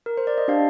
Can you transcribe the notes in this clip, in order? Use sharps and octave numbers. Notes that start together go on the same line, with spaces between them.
A#4
C5
D5
D#5
D4 G4 F5